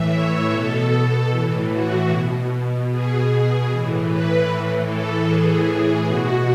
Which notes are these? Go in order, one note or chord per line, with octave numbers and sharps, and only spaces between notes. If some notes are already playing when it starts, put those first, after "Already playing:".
Already playing: A2 E3 E5
C#5
B2 A4
A2 E3
F#4
B2
B2 G#4
A2 E3
B4
A2 E3
A4
A2 E3 G#4
B2 F#4